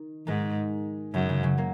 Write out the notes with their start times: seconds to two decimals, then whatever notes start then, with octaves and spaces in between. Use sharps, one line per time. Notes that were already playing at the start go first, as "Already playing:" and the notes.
Already playing: D#3
0.27 G#2 D#3 G#3
1.14 F#2 C#3 F#3
1.29 C#3
1.43 C#3 F#3
1.58 F#3 A#3